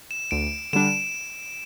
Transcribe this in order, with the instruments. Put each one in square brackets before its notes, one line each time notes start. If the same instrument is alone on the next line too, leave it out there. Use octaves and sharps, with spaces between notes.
[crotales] E7
[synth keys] D2 [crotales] D7
[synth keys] D3 G3 D4 [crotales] E7